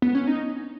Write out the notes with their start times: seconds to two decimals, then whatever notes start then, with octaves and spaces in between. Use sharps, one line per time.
0.02 B3
0.15 C#4
0.27 D#4